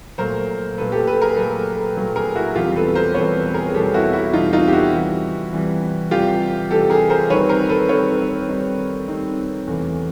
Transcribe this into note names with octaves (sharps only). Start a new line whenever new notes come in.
A#2 F#3 A3 A#4 C5
A#2 F#3 A3 A4 B4
G4 A4
A4 B4
G#4 A#4
A#2 F#3 A3 A4 B4
A#2 F#3 A3
G#4 A#4
E4 F#4
E2 B2 G3 C4 F4 G4
A4 B4
A#4 C5
E2 B2 G3 C4 B4 C#5
G#4 A#4
G#4
E2 B2 G3 C4 G4 A4
E4 F#4
E4 F#4
E2 B2 G3 C4 D#4 F4
D#4 F4
G4
E4 F#4
C3 E3 G3
C3 E3 G3
C3 E3 G3 F4 G4
C3 E3 G3 G4 A4
G#4 A#4
A#4 C5
D#3 G3 C4 D#4 B4 C#5
A#4 C5
A4 B4
D#3 G3 C4 D#4 B4 C#5
D#3 G3 C4 D#4
D#3 G3 C4 D#4
E2 C3 E3 A3